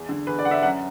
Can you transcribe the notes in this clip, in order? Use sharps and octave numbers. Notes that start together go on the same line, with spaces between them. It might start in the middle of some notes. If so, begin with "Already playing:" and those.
Already playing: E2
D3
E2 B4
D5
D3 F#5
E5
F#2 F#5